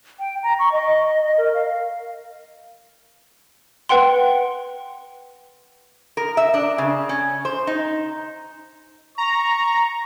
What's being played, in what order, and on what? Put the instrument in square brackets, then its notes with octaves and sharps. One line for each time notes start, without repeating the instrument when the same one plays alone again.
[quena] G5
A#5
C#6
D#5
A#4
F5
[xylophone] B4 F#5 G5 C6
[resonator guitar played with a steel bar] A#4
E5
D4
C#3
C#4
C5
D#4
[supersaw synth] A#5 [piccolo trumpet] C#6